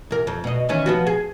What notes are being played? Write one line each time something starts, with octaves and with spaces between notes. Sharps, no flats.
E2 A#4
F2
B2 D#5
D#3 E3 C#4
F3 B3 F#4
G#4